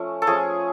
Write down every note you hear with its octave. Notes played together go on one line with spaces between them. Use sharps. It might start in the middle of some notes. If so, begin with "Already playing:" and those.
Already playing: F3 A3 C#4
A4
F3 A3 C#4 G#4